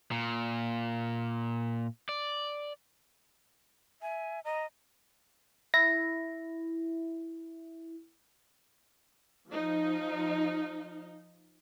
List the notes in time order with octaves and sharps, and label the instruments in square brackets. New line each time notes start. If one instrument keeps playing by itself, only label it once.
[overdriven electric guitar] A#2
D5
[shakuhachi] E5 [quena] G#5
[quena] D#5 [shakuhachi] A#5
[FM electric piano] E4 [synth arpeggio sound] A#6
[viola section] F3 D#4